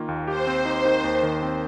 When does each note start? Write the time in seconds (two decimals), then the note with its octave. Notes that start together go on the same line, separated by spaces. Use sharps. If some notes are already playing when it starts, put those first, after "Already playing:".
Already playing: D#3 A#3 F4
0.08 D#2
0.27 G4 C5
0.47 C4
0.65 D#4
0.85 D#3
1.04 D#2
1.23 D#3
1.42 C4